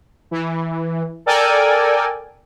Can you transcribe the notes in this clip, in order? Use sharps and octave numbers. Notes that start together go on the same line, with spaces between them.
E3
A4 A#4 D5 G5 G#5